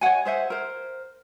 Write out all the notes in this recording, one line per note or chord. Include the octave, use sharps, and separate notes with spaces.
C#5 D#5 F#5 G#5
G#4 C5 E5 F#5
A#4 C5